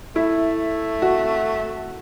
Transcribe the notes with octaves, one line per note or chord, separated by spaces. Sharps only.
A3 E4
F#4